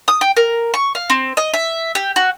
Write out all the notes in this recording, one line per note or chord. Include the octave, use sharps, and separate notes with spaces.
D#6
G5
A#4
C#6
F5
C4
D#5
E5
G4
F#4